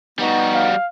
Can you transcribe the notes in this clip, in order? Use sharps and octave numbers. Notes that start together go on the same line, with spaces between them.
G3 B3 D#4 F#4
F5